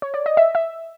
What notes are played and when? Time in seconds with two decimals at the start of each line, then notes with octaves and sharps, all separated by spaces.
0.02 C#5
0.14 D5
0.26 D#5
0.37 E5
0.55 E5